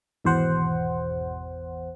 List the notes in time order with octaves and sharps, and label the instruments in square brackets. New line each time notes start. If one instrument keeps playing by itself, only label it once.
[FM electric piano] G#1 E2 B2 C5 F#5